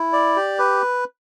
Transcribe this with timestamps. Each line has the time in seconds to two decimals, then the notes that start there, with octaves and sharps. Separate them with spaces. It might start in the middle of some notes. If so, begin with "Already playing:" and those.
Already playing: E4
0.13 D5
0.36 G4
0.59 B4